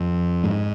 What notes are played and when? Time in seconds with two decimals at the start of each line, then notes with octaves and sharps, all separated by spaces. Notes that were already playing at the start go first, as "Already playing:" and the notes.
Already playing: F2
0.44 G#2